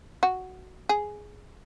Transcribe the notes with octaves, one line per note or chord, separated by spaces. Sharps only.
F#4
G#4